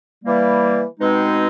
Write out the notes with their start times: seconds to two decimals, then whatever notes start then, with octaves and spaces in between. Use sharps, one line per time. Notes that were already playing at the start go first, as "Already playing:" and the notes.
0.24 E3 G3 A#3
1.00 B2 G#3 C4 D#4